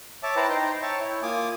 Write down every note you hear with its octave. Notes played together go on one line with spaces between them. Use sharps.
C#5 E5 A5 D6
E4 B4 C5 G5 A5 A#5
D#4 C5 G5 A#5 C6
C#5 E5 G5 A5 C#6
E4 C#5
A#3 F4 G#5 D6 D#6